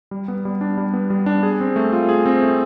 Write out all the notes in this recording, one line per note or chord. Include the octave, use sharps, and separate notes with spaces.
G3
B3
G3
D4
G3
B3
G3
D4
G#4
C4
A3
F4
G#4
C4
A3